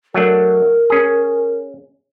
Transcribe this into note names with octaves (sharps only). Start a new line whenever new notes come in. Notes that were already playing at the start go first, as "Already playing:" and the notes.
F#3 A3 D4 A#4
C#4 G#4